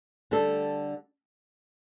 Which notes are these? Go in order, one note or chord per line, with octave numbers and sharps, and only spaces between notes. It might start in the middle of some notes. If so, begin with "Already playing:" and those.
D3 G3 D4 A4